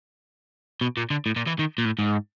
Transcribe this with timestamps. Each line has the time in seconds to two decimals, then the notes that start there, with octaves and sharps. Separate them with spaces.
0.81 B2
0.97 A#2
1.10 D3
1.26 A2
1.36 A#2
1.47 E3
1.59 D#3
1.78 A#2
1.85 A2
1.99 G#2